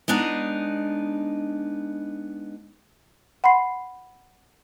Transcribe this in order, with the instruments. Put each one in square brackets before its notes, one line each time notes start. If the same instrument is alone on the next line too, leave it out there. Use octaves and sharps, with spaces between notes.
[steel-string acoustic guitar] G#3 B3 D4 D#4
[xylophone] F#5 B5 C6 C7